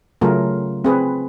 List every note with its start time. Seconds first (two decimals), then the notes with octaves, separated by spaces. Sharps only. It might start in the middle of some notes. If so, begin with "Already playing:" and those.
0.21 C#3 F#3 A3 F4 G#4 A#4
0.84 C4 G#4 B4